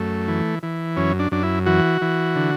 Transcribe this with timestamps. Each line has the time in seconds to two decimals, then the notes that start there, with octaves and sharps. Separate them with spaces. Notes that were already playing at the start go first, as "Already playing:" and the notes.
Already playing: F#2 A3
0.28 E3
0.63 E3
0.96 F#2 C#4
1.19 D4
1.31 F#2 D4
1.43 E4
1.66 E3 F#4
2.02 E3
2.36 D3